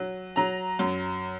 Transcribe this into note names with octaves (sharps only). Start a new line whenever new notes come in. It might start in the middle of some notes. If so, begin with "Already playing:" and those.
Already playing: F#3
F#3 A#5
F#2